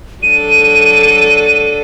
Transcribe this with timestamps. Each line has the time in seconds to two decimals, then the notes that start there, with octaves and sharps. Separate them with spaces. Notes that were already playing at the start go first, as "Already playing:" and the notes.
0.23 F#3 D4 A4 D#7